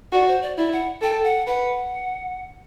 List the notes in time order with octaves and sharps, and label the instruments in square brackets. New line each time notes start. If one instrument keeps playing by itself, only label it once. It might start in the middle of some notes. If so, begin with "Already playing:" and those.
[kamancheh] F#4 [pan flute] D5
[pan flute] C5
D5
[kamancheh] E4 [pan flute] D5
[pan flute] F#5
[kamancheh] A4 [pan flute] G5
[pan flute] F#5
[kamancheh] B4 [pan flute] F#5